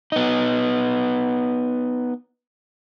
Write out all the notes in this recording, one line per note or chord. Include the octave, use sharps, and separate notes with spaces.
B3 D#4